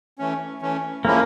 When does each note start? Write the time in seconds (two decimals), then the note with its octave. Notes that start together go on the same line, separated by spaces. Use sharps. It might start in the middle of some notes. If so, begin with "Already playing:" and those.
0.19 E3 A3 C#4
0.62 E3 A3 C#4
1.05 F3 G#3 A#3 C#4 E4